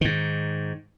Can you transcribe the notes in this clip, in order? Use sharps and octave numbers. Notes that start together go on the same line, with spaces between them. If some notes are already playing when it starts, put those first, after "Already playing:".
G#2 D#3